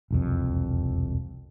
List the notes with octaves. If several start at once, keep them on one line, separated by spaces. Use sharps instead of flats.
E1 C2 F2